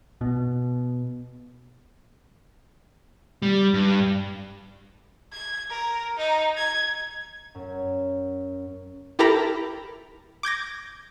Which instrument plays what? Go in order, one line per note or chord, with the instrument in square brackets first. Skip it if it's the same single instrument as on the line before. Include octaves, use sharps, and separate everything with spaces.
[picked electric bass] B2
[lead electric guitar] G3
G2
[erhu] G#6
A#4
D#4
G#6
[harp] F#2
[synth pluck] E4 G4 A4 A#4 A#5 B5
D6 G6 G#6 A#6